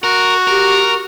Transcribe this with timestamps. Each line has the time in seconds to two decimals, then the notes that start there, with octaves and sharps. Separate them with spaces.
0.04 F#4 A#4
0.48 G4 A#4